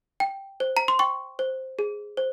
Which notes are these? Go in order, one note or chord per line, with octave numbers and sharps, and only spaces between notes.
G5
C5
A#5
C6
G5 C#6
C5
G#4
C5